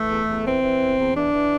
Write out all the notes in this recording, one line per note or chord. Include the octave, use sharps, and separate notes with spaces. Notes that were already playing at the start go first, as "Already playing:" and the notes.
Already playing: E3 A3
E2
E2
E3 C4
E3
E2
E2
E3 D4
E3